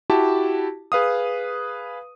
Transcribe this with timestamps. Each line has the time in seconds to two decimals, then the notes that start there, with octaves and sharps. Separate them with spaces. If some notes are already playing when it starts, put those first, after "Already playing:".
0.10 E4 F#4 G4 A5
0.92 G#4 B4 F5 D#6